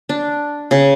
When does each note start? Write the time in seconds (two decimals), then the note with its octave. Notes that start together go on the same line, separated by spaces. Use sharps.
0.09 D4
0.71 C#3